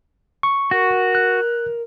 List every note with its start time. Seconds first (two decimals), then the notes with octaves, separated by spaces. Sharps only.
0.43 C#6
0.71 F#4 A#4
1.15 F#6